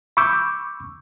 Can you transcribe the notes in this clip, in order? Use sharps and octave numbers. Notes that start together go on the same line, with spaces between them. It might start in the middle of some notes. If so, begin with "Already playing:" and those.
B5 C#6 D6 E6 G6